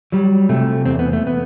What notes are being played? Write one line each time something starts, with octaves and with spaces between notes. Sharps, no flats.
F#3 G3
C3 A3
E2 C4
B3
A3
B3